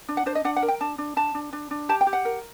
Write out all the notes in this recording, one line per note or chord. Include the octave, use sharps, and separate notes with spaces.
D4
F#5
D4 C5
D#5
D4 F#5
F#5
A#4
G5
D4 A5
D4
D4 A5
D4
D4
D4
G4 A5
G5
G4
F#5
A#4